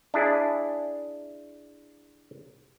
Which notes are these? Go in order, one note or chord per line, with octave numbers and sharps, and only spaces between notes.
D4 E4 G#4